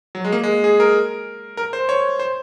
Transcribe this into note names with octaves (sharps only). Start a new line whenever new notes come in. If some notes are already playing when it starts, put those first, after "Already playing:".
F#3
G#3
A#3
G#3
G#4
A#4
A#4
C5
C#5
C5